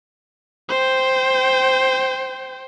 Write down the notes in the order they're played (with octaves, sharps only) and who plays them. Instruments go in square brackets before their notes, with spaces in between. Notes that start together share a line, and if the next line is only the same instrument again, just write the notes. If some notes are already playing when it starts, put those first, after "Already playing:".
[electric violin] C5 G5